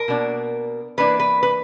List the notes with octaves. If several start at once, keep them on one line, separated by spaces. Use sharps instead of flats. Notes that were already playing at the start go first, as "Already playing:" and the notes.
Already playing: A#4
B2 A#3 D4
E3 A#3 D4 B4
B4
B4